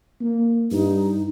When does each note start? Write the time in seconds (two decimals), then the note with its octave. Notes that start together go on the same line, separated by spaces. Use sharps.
0.21 A#3
0.71 G2 D#4